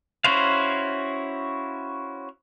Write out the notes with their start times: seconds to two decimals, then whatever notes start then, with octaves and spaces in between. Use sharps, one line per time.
0.24 C#4 E4 F#4 C5 F5